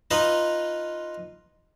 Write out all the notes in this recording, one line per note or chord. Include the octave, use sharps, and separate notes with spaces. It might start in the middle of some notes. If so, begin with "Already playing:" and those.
D#4 F4 B4 D#5